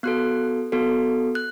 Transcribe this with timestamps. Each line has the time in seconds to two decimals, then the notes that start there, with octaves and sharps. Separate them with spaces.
0.03 B3 F#4 A4 F#6
0.72 B3 F#4 A4
1.35 F#6